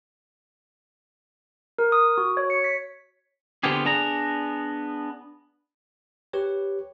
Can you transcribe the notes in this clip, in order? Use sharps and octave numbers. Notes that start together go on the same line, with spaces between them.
A#4
D#6
F#4
C#5
C#7
B6
D3 B3 C4 F4 G4 G#4
B3 D4 G#4 A#5
G4 B4 C#5